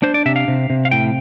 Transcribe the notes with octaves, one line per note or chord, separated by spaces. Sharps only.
D4 C5
D5
C3 E5
F5
C3
C3
F5
A2 G5